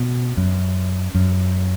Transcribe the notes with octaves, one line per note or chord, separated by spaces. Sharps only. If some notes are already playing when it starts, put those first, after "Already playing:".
Already playing: B2
F#2
F#2